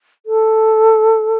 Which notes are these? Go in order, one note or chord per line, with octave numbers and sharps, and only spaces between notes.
A4